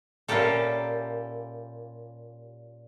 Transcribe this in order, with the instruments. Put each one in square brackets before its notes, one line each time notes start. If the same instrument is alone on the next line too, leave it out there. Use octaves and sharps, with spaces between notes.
[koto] A#2 C#4 E4 G4 A4